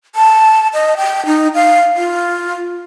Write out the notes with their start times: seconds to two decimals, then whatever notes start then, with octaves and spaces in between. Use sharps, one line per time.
0.15 A5
0.74 D#5
0.97 G5
1.26 D#4
1.55 F5
1.96 F4